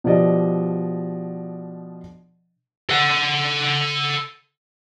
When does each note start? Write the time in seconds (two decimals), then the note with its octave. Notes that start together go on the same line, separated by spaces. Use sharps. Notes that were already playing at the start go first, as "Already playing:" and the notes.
0.04 B2 F3 D4 G4 D5 D#5
2.90 A4 F#5